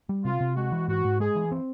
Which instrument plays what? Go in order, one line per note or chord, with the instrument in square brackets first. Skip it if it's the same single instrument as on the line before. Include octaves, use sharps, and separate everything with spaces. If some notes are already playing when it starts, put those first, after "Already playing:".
[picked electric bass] G3
[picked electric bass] C3 [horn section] F4
[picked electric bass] C3
[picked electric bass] G#3 [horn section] F#4
[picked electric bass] E3
[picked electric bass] G#2 [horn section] F#4
[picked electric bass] G#2
[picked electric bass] G#3 [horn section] G#4
[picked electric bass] E3
C4